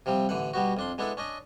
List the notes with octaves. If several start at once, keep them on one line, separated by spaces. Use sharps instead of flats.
C3 F3 G3 C4
A1 D3 E3 F#5
B2 G3 B3 F#4
F2 D4 C6
G#3 B3 D4 E4 A4
C#4 D4 D#5